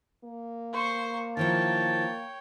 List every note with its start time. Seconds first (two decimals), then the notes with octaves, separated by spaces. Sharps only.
0.24 A#3
0.72 C5 C#6
1.37 D#3 F3 E4 C#5 G5 A5